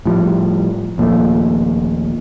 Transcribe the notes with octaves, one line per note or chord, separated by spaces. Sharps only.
A2 F3 G3
D#2 A#2 F3 A3